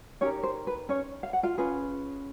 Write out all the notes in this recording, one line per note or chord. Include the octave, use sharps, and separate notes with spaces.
C#4 D#4 G4 A#4 C#5
C5
B4
C#4 C#5
F5
F#5
F4 F5
C#4 F4 G#4 B4